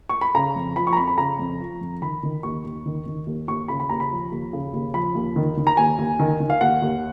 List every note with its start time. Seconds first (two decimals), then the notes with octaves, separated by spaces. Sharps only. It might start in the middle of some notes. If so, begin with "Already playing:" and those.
0.09 C#6
0.21 B5
0.35 C#3 A#5
0.56 F2
0.76 F3 B5
0.87 C#6
0.93 A#5
0.97 F2 B5
1.07 B5
1.18 C#3 A#5
1.39 F2
1.60 F3
1.81 F2
2.02 D#3 B5
2.23 D#3
2.43 D#2 C#6
2.64 D#2
2.86 D#3
3.06 D#3
3.27 D#2
3.48 D#2 C#6
3.68 C#3 B5
3.80 B5
3.89 D#2 A#5
4.00 B5
4.11 F3
4.31 D#2
4.53 C#3
4.73 D#2
4.94 F3 B5
5.15 D#2
5.36 D#3
5.57 D#3
5.67 A#5
5.77 D#2 G#5
5.98 D#2
6.19 D#3
6.40 D#3
6.50 F5
6.61 D#2 F#5
6.82 D#2